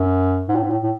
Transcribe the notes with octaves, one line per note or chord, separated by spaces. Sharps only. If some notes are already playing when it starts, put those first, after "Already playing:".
Already playing: F#2
G#2
A2
G#2
A2
A2